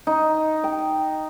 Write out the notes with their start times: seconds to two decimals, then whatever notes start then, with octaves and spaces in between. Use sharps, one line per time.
0.07 D#4
0.64 G5